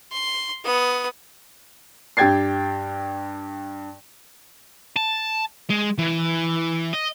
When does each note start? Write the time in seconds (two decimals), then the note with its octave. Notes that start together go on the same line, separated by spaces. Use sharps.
0.12 C6
0.65 B3 D#6
2.17 G2 G4 G5 G#6 A6 C7
4.97 A5
5.70 G#3
5.98 E3
6.93 D#5